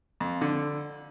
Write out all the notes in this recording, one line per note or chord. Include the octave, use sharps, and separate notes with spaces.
F2
D3